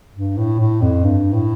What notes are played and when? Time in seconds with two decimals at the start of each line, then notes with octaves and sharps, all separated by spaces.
0.16 G2
0.38 A2
0.60 A2
0.82 F2
1.04 G2
1.34 A2